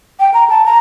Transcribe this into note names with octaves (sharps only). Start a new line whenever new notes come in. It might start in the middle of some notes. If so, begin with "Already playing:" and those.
G5
A#5
A5
A#5